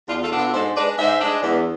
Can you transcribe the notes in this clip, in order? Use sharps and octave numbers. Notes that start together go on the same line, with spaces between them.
E2 D4 F4
F4 A4
B2 B3 D4
F4 A4
G#2 A4 C5
G#3 D4 B4 D5
G#2 C5 E5
G#3 D4
E2